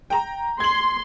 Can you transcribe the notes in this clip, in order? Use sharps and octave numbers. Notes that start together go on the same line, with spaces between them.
G5 A#5
C6 G#6 F#7